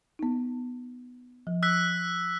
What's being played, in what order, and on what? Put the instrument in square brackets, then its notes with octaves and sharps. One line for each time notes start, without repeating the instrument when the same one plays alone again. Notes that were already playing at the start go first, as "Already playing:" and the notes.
[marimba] B3 D#4
F3
[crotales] E6 F#6 B6